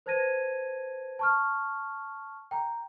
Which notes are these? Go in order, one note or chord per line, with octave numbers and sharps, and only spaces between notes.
B4 C5 A5 G#6 A#6 D#7
A5 C#6 F6
G5 A#5